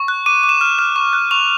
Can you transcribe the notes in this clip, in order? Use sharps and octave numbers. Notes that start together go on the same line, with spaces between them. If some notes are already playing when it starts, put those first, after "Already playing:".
Already playing: C#6
F#6
D6 D#7
D6
E7
F6
F6
C#6
F#6
C#6 F7